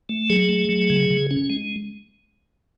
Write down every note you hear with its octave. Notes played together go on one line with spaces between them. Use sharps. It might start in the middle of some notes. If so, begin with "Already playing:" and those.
A3
F#3 G#4
A3
F#3
C#3
C#3
C#4
G#3